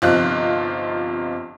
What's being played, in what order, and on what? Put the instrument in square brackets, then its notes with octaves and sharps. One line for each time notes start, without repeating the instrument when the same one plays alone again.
[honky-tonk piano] G1 C3 F3 D#4 F4 F#6